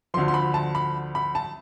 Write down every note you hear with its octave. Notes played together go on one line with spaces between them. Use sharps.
D2 D3 F3 C6
C6
B5
A5
B5
B5
A5